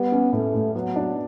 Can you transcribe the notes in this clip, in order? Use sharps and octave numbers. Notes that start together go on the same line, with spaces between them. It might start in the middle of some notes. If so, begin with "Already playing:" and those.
Already playing: G3 B3
C#4
A2 A3
A2
F#3 B3
D4